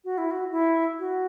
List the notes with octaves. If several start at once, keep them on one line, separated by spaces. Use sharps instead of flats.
F#4
E4
F#4
E4
F#4